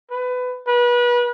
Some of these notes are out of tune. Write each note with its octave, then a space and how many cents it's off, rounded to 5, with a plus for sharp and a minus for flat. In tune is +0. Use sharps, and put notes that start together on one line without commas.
B4 +20
B4 -30